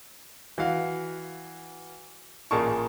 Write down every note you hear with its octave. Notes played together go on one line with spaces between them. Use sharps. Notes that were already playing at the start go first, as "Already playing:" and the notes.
E3 F#4 F5
A1 A#2 G#4 A#4 A5 C#6